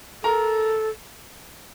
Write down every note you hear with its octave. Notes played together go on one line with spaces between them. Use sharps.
A4 A#4 A#5